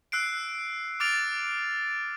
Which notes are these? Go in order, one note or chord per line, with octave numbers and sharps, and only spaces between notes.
E6 F#6 C7 D7
D6 F6 A6 D7 F7